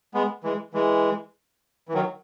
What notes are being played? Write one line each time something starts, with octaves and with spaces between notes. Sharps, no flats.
G#3 B3
E3 G#3
E3 G#3
E3
D#3 F#3